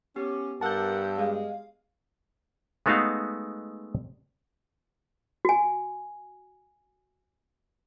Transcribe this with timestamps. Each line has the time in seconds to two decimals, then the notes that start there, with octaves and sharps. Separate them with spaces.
0.16 B3 C#4 G4
0.61 G2 A#4 F#5 A5 E6 G6
1.18 G#3 F5
2.86 G#3 A3 B3 D#4 F#4 F5
5.45 F#4 G#5